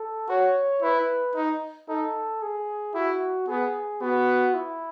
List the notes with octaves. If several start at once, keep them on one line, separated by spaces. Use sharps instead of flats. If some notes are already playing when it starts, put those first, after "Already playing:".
Already playing: A4
F#4 C#5
E4 B4
D#4
D#4 A4
G#4
E4 F#4
B3 G#4
B3 F#4
E4